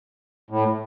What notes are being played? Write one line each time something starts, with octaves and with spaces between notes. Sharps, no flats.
A2